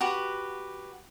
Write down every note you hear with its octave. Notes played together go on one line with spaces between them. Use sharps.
F#4 G4 B4